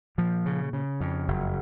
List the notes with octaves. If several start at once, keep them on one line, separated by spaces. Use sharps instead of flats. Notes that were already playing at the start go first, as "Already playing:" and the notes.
A#2 F3
C#3
C#3
F2
F#1